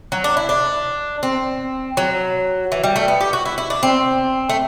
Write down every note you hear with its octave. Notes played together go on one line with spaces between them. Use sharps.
F#3
D4
E4
D4
C4
F#3
E3
G3
A3
B3
G4
F#4
E4
E4
D4
C4
A3